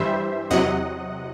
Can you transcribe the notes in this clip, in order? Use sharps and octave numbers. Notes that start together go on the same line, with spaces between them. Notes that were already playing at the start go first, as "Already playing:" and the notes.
Already playing: G2 E3 G3 C5 E5
E2 C3 F#3 D#5 F#5